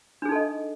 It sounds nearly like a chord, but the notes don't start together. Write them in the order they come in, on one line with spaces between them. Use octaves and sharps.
D4 G#4 D#4 A4 D#5